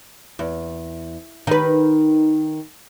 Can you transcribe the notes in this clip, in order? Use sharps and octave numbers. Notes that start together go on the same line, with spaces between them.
E2
D#3 B4